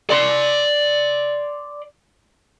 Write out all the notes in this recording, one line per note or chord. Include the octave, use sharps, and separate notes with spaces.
D5 C6